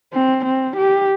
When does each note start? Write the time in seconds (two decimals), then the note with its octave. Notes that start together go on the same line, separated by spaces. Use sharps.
0.13 C4
0.45 C4
0.77 G4